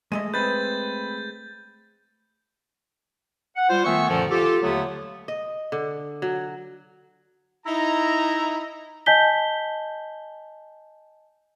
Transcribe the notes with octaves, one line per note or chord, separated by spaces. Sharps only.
G#3 A3 D#5 D#7
C4 B4 G6 A6
F#5
G3 F4 C5
D#3 A3 B3 E5 G#5 C#6
F#2 A#2 D3 D#3 F3
F4 G4 A4
D#2 D3 F#3 A3 B3
D#5
D3
F#3
D#4 E4 A#5
D#5 G#5 A5 G6 B6 G7